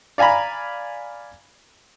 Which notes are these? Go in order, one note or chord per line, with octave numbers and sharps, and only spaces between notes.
D5 F5 G#5 A#5 B5